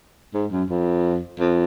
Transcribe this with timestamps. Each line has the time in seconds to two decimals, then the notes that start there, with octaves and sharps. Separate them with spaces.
0.34 G#2
0.52 F#2
0.69 F2
1.39 F2